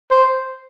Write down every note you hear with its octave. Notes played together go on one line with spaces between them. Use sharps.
C5